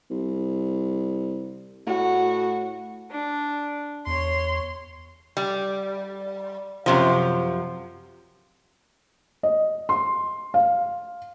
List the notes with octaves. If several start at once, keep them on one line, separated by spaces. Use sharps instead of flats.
C2
A2 F#4
D4
E2 C#5 C6
G3
F#2 C3 F3
D#5
C6
F5